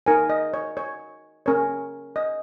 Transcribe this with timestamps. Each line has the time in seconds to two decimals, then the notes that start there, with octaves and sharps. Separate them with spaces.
0.06 D#4 A#4 C#5 G#5
0.30 D#5
0.54 C#5
0.77 C#5
1.46 C#4 A#4 C#5
2.16 D#5